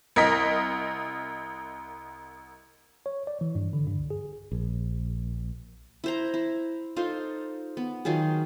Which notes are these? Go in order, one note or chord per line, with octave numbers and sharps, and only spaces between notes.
C2 A#4 D#5 B6
C#5
D5
E3
G2
D3
G2
C2
G#4
A#1
E4 C5 A#5
E4
D#4 F4 A4 C5
B3
D#3 F#3 F4 G#4